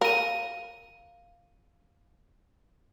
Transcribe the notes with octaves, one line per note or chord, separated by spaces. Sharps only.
A#4 F5 D#7